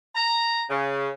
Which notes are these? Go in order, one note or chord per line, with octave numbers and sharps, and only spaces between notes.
A#5
C#3